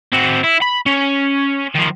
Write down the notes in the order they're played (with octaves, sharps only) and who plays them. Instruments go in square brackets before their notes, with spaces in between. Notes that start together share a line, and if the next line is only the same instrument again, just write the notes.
[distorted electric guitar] C4 F#4
E4
B5
C#4
D#3 F3